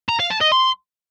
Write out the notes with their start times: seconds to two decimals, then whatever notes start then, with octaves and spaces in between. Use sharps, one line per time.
0.09 A#5
0.19 F5
0.30 A5
0.41 D#5
0.52 C6